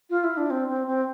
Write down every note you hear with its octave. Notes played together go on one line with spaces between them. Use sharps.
F4
E4
D4
C4
C4
C4